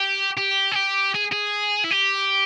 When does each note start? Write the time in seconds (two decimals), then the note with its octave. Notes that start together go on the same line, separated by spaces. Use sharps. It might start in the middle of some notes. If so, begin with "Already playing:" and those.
Already playing: G4
0.37 G4
0.72 G#4
0.75 G4
1.14 G#4
1.32 G#4
1.84 E4
1.91 G4